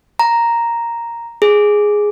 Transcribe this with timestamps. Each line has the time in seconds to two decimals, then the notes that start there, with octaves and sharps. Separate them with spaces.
0.19 A#5
1.42 G#4